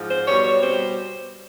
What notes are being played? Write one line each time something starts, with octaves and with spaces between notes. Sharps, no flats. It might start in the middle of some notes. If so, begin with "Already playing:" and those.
Already playing: G#2 F3
C5
B2 G3 C#5
C#5
B2 G3 C5